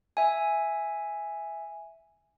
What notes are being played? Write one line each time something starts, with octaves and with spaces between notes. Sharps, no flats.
E5 G#5